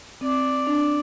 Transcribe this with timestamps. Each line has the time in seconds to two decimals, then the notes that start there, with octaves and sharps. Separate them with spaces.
0.21 C4 D5
0.67 D4